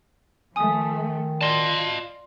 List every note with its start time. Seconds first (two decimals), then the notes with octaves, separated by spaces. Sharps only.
0.56 D#3 F3 A3 G#5 D#6
1.41 F4 D5 D#5 A5 C6